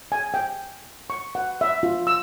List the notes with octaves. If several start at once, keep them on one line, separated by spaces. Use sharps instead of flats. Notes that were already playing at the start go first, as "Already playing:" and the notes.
G#5
G5
C#6
F#5
E5
F4
E6